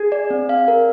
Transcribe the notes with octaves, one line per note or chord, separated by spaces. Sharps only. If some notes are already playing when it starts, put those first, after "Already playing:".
Already playing: G#4
D5
C4
F5
A#4